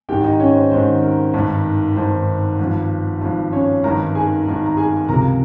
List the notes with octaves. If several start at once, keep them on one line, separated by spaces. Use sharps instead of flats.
G#1 G#2 D#3 G4 G5
D#4 D#5
C#4 C#5
C5
G#1 G#2 D#3 C5
A#4
G#1 G2 D#3
G#1 G2 D#3 C5
G#1 G2 F3
G#1 G2 F3
C#4 C#5
G#1 G2 D#3 A#4 A#5
G#4 G#5
G#1 G2 D#3
A#5
G#4 G#5
C#2 C3 F3 A#4 A#5